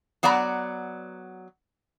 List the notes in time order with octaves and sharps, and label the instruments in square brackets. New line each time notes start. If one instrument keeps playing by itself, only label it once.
[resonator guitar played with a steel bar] F#3 B3 D5 F#5 A#5